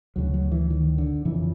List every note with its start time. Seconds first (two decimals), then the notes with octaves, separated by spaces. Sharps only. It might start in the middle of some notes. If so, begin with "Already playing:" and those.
0.16 D2 C#3 F#3
0.34 F#3
0.52 E3
0.70 D#3
0.98 D3
1.25 F2 C#3 E3